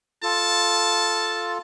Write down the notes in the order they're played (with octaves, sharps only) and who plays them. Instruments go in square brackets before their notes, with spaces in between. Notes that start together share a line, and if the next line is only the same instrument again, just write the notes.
[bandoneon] F4 A4 [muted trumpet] A5